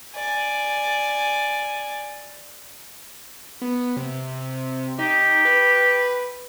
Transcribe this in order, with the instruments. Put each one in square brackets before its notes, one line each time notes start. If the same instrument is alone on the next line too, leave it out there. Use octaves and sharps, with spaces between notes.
[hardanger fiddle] D5 G#5
[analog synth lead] B3
C3
[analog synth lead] D#4 [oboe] G4
[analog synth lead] B4